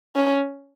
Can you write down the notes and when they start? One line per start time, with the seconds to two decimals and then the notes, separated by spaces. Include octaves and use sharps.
0.16 C#4